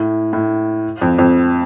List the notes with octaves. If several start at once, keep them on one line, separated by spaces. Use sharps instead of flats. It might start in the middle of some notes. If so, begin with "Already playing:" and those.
Already playing: A2
A2
F2
F2